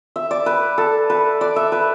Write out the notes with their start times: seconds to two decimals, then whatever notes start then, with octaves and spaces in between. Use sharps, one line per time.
0.16 E5
0.31 D5
0.46 B4
0.78 A4
1.10 B4
1.41 D5
1.56 E5
1.72 B4